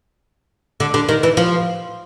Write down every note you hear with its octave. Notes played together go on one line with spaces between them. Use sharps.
D3
D3
D#3
E3
F3